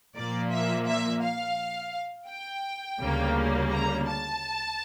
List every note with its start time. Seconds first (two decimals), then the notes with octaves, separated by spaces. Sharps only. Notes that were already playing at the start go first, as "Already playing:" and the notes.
0.15 A#2 F3 A#3 D5
0.52 E5
0.87 E5
1.22 F5
2.28 G5
3.00 D2 C#3 G3 A#3
3.71 A#5
4.06 A5